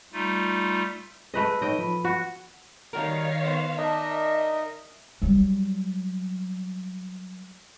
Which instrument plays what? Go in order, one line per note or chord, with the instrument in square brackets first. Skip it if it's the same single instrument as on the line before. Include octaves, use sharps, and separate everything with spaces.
[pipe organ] G3 A3 D#4 F4
[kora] A3 B4 D#5 [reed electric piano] G#4
[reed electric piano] A2 D#4 C#5 [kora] D#5 G5
[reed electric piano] F3 B5
[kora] F#4
[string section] D#3 C#5 F5 [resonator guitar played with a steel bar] G3 F#4 A#4
[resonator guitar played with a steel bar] B3 C5
[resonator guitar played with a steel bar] D4 [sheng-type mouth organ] D#4 A#4 D#5 [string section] E5
[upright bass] F#3 G3